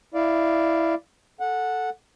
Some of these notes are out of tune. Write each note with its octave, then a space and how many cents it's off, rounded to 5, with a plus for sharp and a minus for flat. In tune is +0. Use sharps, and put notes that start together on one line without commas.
E4 +0 D5 +0 F5 -10
A4 +0 F#5 -10